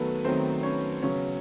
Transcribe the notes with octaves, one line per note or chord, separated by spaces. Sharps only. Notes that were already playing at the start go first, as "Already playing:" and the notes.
Already playing: D#3 F#3 A3 B3 A4 B4
D#3 F#3 A3 C4 C5
C#4 C#5
C#3 F#3 B3 C#4 C#5